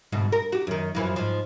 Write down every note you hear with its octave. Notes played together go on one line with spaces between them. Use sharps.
D2 G#2 B2
A#4
F#4 G4
F#2 D#3
F#2 E3 F3
G#2 F3